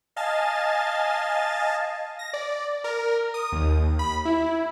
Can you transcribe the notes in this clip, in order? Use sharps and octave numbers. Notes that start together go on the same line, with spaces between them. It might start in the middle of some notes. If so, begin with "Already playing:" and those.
D#5 F5 G#5 A5 A6
A#6
D5
A#4
D#6
D#2
B5
E4